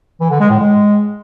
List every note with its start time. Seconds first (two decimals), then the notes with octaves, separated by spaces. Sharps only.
0.20 E3
0.30 D3
0.40 G#3
0.50 A2
0.60 G#3